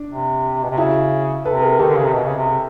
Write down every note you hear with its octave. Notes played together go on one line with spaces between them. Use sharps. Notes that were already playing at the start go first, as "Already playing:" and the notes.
Already playing: D4
C3
B2
C3
C#3 E4 F#4
C3 A4 B4
G#4 A#4
D#3 G4 A4
D3
C#3
C3
B2
C#3
C3